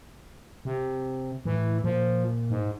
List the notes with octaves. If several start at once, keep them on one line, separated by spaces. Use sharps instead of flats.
C3
A2 E3
A#2 F3
G#2